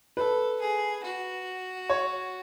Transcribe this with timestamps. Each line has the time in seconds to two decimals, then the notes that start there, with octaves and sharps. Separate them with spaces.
0.17 A4 B4
0.60 G#4
1.03 F#4
1.90 C#5